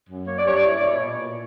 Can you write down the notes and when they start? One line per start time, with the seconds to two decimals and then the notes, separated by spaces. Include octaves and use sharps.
0.09 F#2
0.27 A#3 C#5
0.38 D5
0.45 G2 C#5
0.56 D5
0.64 E4 C#5
0.76 D5
0.81 B2 C#5
0.99 A#2
1.19 A#2